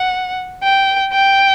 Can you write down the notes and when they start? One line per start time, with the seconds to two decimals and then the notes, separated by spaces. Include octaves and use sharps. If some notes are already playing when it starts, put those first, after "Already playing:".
Already playing: F#5
0.63 G5
1.13 G5